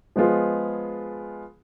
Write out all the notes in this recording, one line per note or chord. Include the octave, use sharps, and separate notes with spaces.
F3 G#3 B3 F4 G#4